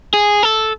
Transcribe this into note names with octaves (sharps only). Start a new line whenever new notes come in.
G#4
A4